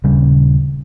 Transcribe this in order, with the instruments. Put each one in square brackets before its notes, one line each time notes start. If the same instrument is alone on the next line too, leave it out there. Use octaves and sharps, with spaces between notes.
[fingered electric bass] D#1 C#3 G3